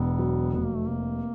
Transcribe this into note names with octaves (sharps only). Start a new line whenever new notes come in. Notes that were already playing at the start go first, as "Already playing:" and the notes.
Already playing: E1 B3
F#3
F1 B3
A#3
A3
C3 A#3